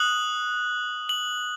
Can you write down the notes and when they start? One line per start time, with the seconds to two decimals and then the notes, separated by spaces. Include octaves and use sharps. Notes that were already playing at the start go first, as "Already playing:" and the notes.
Already playing: D#6 F#6 F#7
1.09 F#7